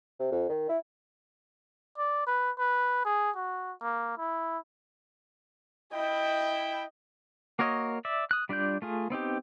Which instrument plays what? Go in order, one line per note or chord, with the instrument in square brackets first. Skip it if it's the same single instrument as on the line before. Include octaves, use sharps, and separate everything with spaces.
[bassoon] C3
F2
D#3
E4
[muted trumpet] D5
B4
B4
G#4
F#4
A#3
E4
[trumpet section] E4 G5 [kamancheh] D#5
[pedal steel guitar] A#3 F#4 A#4 C#5 D#5
D5 E5
D#6 F#6
G3 D4 F4 D5 G6
A3 F4 G#4
B3 C4 D#4 G4